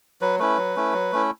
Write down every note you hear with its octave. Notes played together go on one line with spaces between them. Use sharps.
F#3 B4
A3 C#4 E4 B4
F#3
A3 C#4 E4
F#3
A3 C#4 E4